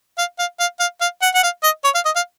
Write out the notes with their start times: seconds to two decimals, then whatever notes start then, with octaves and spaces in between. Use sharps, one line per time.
0.18 F5
0.39 F5
0.60 F5
0.80 F5
1.01 F5
1.22 F#5
1.35 F#5
1.43 F5
1.63 D#5
1.84 C#5
1.95 F5
2.05 D#5
2.16 F5